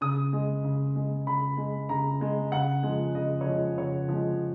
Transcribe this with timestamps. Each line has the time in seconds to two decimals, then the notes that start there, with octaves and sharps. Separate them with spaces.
0.01 C#3 D#6
0.33 G#3
0.64 C#3
0.96 G#3
1.26 C#3 B5
1.57 G#3
1.89 C#3 A#5
2.21 G#3
2.52 C#3 F#5
2.83 F3 G#3
3.15 C#3 D#5
3.41 C#5
3.46 F3 G#3 D#5
3.78 C#3 C#5
4.08 F3 G#3